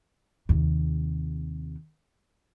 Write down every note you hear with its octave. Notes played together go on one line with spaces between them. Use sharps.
D#2 C3